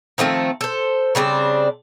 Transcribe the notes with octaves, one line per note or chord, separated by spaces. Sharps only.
D#3 F3 A3 C4
A4 C5
C#3 G3 C4 D4